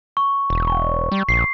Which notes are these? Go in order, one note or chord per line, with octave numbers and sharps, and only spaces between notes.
C#6
E1
C#6
G3
A#1 C7